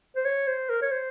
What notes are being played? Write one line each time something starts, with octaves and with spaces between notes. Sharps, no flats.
C5
C#5
C5
A#4
C#5
C5